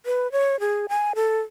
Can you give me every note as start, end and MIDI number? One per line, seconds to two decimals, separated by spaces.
0.06 0.30 71
0.32 0.59 73
0.60 0.86 68
0.89 1.13 80
1.15 1.40 69